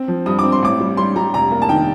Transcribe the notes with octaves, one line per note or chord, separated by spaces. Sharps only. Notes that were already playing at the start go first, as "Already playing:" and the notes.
Already playing: C4
F3
G2 D#6
C4 D6
C6
A1 D6
G3
G3 C6
G3 A#5
F1 A#5
A#3
A5
D#3 G5